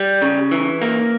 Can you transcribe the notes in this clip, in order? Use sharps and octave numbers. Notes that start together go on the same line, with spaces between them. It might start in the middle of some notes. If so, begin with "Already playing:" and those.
Already playing: G3
C#3
E3
A#3